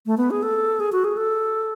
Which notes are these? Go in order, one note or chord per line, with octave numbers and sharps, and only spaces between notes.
A3
B3
G#4
A4
G#4
F#4
G#4
A4